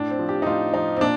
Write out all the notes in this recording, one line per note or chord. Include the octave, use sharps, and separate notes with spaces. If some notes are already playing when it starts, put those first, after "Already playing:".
Already playing: A2 D4
C4
F3
G4
D#4
A2 F4
F3 D#4
C4
A#2 D4